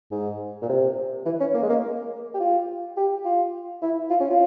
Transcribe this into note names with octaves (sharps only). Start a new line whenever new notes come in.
G#2
A#2
C3
E3
C#4
A#3
G#3
A#3
G4
F4
G4
F4
E4
F4
C#4
F4